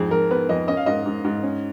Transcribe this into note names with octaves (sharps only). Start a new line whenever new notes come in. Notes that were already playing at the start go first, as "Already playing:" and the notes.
Already playing: F2 G#2 G#4
F2 A#4
B3 B4
F2 D#5
C#4 D#5
F5
G#2 D#5
G#2
G#2
C#4